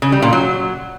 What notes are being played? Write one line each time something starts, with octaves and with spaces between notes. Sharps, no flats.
C#3
G3
A#2
F#3